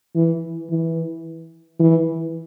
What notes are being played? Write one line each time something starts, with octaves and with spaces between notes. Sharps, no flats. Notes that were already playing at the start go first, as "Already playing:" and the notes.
E3
E3
E3